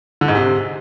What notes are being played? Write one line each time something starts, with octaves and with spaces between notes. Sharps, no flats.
D3
G#2
C3